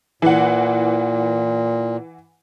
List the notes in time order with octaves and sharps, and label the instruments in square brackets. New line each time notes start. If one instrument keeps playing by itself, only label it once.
[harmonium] A#2 [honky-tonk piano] E3 F#5